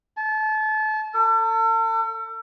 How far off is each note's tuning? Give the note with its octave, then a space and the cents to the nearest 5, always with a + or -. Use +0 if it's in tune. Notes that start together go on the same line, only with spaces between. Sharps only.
A5 -30
A4 +40